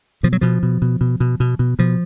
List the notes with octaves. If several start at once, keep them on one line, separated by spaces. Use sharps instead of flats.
B2 F3
F#3
B2 F3
B2
B2
B2
B2
B2
B2
B2 F3